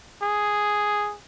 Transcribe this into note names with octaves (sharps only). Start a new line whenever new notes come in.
G#4